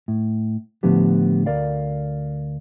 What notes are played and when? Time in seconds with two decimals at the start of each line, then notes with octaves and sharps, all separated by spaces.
0.08 A2
0.83 A2 D3 F3 B3 G4
1.46 D2 A#4 D5 F5